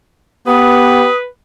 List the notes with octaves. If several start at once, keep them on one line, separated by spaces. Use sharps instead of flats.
B3 G4 B4 D#6